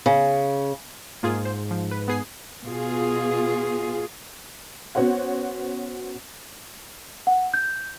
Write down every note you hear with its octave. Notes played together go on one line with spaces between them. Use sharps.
C#3
G#2 A#3 F4 G#4
C5
F3
B4
B3 G#4 C7
B2 F4 G#4
B3 C#4 F#4 C5 C#5 F#5
F#5
G6